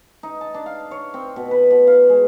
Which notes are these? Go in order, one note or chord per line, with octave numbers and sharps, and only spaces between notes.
D#4
A5
D4
F5
C#5
C4
B2
B4
B2
F5
G#3